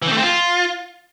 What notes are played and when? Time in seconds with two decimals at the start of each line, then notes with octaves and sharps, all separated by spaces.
0.02 E3
0.07 C4
0.12 A3
0.18 C4
0.23 F4